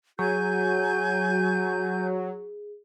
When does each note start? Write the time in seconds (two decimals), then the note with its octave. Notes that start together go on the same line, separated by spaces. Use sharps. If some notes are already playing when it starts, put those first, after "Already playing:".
0.19 F#3 F#4 G#4 G#5 G6